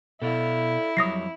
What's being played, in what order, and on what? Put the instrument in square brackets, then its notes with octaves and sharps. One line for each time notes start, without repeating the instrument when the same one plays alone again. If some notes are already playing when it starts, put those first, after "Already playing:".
[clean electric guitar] B2 [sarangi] E4 [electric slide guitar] A4 D5 F5
[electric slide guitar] F2 C#5 [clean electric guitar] F#3 G3 [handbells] D#6 A#6 C7